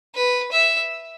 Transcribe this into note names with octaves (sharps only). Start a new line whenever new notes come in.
B4
E5